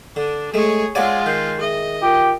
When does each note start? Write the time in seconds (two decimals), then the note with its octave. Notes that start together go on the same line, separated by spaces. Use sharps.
0.16 D3 D4
0.54 G#3 A3 G#4 C#5
0.95 G#3 F4 C#5 D5 F5 F#5 G#5
1.26 D#3 G6 C7
1.61 G#4 D#5 E5
2.02 F4 G4 A#4